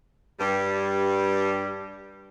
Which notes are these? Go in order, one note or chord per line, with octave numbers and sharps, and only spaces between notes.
G2 G3